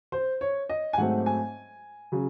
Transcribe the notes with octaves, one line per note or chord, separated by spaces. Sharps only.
C5
C#5
D#5
G#5
G#2 F#3 A3 C4 F#5
G#5
C#3 F#3